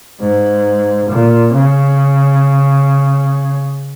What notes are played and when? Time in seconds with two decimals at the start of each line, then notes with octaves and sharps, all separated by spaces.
0.20 G#2
1.09 A#2
1.54 C#3